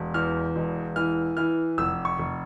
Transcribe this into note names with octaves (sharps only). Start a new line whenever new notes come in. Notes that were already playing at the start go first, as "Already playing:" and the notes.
Already playing: E1
E2 F6
E1
E3 F6
E3 F6
F1 E6
C#6
F1